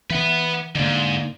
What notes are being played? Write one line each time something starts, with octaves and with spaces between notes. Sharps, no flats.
E3 B4 F#5
E2 G#2 D3 A#3